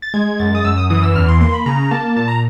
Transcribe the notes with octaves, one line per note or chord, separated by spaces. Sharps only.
A6
G#3 G#6
F#2 A6
D#6
F#2 E6
D#6
E3 D#6
E6
E2 F6
C6
A#3 C6
B5
C#3 A#5
A#3 A5
A#2 A5
A#5